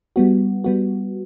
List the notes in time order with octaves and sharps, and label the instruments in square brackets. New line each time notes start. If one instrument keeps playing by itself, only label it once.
[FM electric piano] G3 B3 F#4
G3 B3 F#4